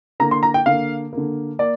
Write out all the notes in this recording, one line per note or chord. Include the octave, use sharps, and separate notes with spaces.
D3 A#3 A#5
C6
A#5
G5
D3 A#3 F5
D3 A#3
A#3 D5